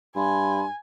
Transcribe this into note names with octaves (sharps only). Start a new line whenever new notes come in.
G2 G#5 B5 C6